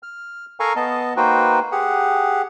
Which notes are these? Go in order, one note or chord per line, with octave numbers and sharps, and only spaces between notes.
F6
A4 A#4 F5 G#5 A#5 C#6
B3 D#5 A5
A#3 D#4 F#4 B4 C5 G5
G4 G#4 F#5